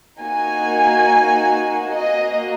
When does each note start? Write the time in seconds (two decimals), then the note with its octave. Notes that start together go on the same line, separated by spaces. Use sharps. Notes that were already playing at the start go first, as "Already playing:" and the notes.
0.20 A#3 D#4 F#4 G#5
1.93 A#3 F#4 D#5